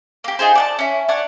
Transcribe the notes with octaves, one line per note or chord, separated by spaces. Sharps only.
A#3 G4
D#4 F4 G#4 C5
D5 F#5 A5
C#4 E4
D4 C#5 F#5